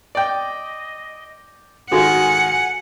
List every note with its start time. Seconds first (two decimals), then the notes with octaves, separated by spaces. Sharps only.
0.15 D5 D#5 G5
1.92 G#2 D#3 D4 F4 F#4 A4 F#5 G#5